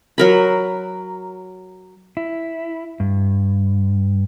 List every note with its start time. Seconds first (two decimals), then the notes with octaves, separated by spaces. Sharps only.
0.18 F#3 A#4 B5
2.17 E4
3.00 G2